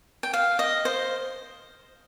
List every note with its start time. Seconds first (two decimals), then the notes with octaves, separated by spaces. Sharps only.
0.23 G5
0.33 F5
0.59 D#5
0.85 C5